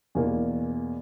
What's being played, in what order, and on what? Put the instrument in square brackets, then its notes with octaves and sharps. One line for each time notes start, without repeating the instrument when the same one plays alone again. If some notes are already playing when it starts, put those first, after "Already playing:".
[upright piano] E2 B2 A#3